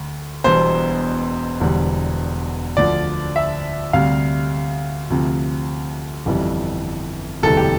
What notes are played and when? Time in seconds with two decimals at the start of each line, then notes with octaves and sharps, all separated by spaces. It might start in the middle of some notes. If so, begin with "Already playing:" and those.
Already playing: D2
0.44 E1 E2 B2 G3 C5
1.60 E1 E2 D3 G3
2.77 D2 D3 F3 D5
3.36 E5
3.93 D2 C3 G3 F5
5.10 D2 C3 F3
6.26 G1 F2 E3 G3
7.43 E1 D2 C3 E3 G3 A4
7.57 G4